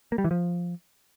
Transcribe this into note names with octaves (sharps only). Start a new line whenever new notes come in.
A#3
G3
E3
F3